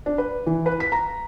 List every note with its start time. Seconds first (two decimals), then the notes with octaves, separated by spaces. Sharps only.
0.06 D4
0.18 B4
0.46 E3
0.66 B4
0.80 B6
0.92 A#5